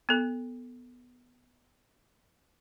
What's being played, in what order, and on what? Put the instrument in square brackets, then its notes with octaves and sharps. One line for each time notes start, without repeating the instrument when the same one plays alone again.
[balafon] B3 A4